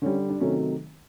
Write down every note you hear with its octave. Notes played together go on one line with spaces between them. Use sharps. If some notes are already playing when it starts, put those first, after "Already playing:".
D3 G3 C#4
D4
C3 D#3 F#3 A3 C#4